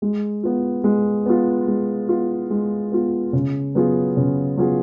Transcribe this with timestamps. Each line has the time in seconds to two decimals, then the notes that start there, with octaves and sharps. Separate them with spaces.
0.02 G#3
0.43 B3 F4
0.84 G#3
1.26 B3 F4
1.68 G#3
2.09 B3 F4
2.50 G#3
2.92 B3 F4
3.33 C#3
3.75 F#3 B3 F4 G#4
4.17 C#3
4.58 F#3 B3 F4 G#4